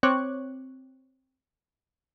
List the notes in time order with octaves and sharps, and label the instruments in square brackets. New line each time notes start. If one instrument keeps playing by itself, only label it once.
[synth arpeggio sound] C4 C#5 C#6 D6 F#6